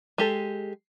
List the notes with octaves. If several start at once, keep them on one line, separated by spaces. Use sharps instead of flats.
G#3 G4 A4